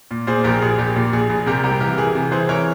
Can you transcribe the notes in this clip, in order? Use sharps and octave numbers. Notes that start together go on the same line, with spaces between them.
A#2
A#2 G#4 C5
A#1 G4 A#4
A#1 G#4
A#1 G4
A#2
A#1 G#4
A#1
C3 G4 A#4
C2 G4 A#4
E3 G4 A#4
E3 G#4
C3
E3 G#4 C5
E3 A#4 C#5